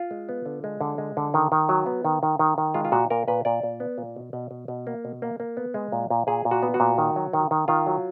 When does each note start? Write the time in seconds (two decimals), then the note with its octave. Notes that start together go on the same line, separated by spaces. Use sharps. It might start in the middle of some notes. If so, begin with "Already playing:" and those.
Already playing: F4
0.11 G#3
0.29 B3
0.46 D3
0.64 G#3
0.81 D3
0.98 G#3
1.17 D3
1.34 D#3
1.52 D#3
1.69 F#3
1.86 B3
2.05 D#3
2.23 D#3
2.39 D#3
2.58 D#3
2.74 G#3 F4
2.85 F4
2.92 A#2 F#4
3.10 A#2 A#4
3.28 A#2 B4
3.45 A#2 D5
3.63 A#2
3.80 B3
3.98 A#2
4.16 B2
4.33 B2
4.51 B2
4.68 B2
4.87 A#3
5.05 B2
5.22 A#3
5.40 A#3
5.57 B3
5.74 G#3
5.92 A#2
6.10 A#2
6.27 A#2 G#4
6.45 A#2
6.51 F#4
6.63 B3
6.74 F#4
6.80 A#2
6.98 D#3
7.16 F#3
7.33 D#3
7.51 D#3
7.68 D#3 F4
7.87 F#3